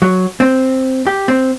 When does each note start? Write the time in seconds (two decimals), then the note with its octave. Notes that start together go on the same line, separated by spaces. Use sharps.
0.02 F#3
0.40 C4
1.07 G4
1.28 C4